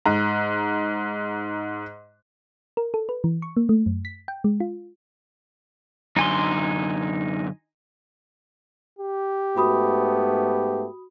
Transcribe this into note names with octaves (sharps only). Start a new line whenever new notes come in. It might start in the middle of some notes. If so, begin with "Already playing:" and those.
G#2 A#5
A#4
A4
B4
E3
C#6
A#3
A3
F#2
B6
G5
G#3
F4
F#2 D3 D#4 G#5 C6
G4
G#2 A3 B3 F#4 B5 D#6